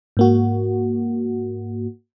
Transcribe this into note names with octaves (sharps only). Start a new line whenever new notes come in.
G#2 A#3 F#4